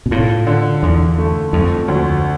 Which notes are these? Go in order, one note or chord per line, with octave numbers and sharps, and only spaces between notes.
B2
A2 F4
D3
E2 D3
A3
F2 A3
D2